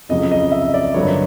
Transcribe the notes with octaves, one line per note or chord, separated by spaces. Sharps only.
F2 C#3 F#3 D#5
D#5
E5
D5
G2 D3 F#3 A#3 C#5